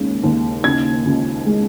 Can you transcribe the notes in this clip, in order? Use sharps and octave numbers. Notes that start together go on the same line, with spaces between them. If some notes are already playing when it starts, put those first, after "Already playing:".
Already playing: D#2 C#3 G#3
D#2
C#3 G#6
C#2
G#3